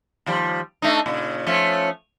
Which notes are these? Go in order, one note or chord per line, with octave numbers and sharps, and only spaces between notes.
D#2 F3 G3
A3 D4 D#4
A#2 C#3
F3 A3 C#4